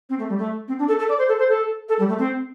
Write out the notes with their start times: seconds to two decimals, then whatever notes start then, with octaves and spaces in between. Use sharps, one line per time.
0.09 C4
0.19 A3
0.29 G3
0.38 A3
0.68 C4
0.79 D4
0.88 A4
0.99 A4
1.09 D5
1.18 C5
1.28 A4
1.39 C5
1.49 A4
1.89 A4
1.99 G3
2.09 A3
2.19 C4